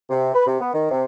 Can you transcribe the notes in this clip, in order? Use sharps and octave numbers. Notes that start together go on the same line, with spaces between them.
C3
B4
C3
B3
D#3
C3